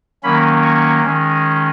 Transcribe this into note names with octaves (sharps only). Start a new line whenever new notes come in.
D#3 F#3 A#3 C#4 B5
C#6
D#3 G#3 C#4